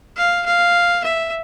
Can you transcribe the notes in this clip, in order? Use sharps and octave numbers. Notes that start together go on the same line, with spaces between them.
F5
F5
E5